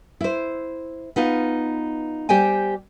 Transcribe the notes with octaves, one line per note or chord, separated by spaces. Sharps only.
E4 C5
B3 D#4 F4
G3 G4 C5 G5 G#5